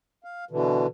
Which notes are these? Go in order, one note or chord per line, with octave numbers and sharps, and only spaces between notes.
F5
B2 D3 E3